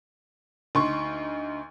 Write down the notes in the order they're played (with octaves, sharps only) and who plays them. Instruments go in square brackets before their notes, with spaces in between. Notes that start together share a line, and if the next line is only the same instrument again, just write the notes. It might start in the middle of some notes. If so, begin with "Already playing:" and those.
[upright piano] D2 D#4 C6 C#6